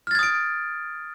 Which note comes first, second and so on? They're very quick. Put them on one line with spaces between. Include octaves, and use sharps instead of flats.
F6 A6 G#6 D#6 D7